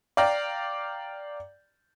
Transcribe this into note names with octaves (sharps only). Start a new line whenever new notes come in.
D5 F5 G5 A#5